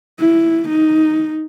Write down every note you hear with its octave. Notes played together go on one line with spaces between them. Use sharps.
E4
D#4